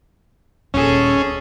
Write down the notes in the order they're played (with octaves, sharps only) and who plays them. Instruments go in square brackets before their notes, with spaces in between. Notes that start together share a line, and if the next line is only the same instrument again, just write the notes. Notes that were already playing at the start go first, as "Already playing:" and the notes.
[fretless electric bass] D#1 [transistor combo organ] C#4 [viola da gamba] G#4 A4